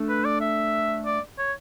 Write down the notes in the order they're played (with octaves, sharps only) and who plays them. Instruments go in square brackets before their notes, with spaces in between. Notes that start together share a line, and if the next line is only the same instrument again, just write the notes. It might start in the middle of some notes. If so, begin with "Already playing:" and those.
Already playing: [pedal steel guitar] A3 D4 A4
[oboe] B4
D5
E5
D5
C#5